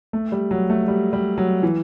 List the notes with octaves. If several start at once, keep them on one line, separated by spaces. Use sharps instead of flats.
A3
G3
F#3
A3
G3
G3
F#3
E3